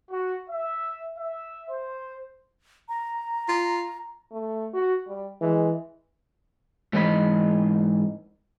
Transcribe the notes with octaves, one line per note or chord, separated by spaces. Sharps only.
F#4
E5
E5
C5
A#5
F4
A3
F#4
G3
E3 G#3
G#2 E3 C5 D#5 B5